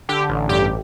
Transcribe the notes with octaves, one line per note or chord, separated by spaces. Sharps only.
D3 G4
A1
G2 G4